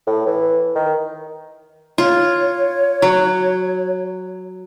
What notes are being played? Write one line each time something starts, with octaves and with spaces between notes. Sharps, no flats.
A2
E3
D#3
F4 C#5
F#3